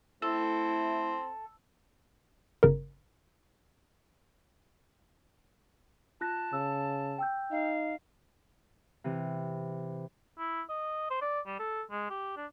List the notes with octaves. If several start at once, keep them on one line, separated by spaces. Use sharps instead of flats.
A3 C4 E4 A4
G1 C#3 A#4
F4 A5 F#6 A#6
C#3 E6
G5 E6 G6
D#4 F5
C3 E3
E4
D#5
C5
D5
G3
A4
G#3
G4
D4